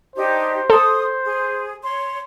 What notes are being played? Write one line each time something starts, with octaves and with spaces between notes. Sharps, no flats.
D4 D#4 G4 C5
A4 C6 D#6
G#4
C#5 C6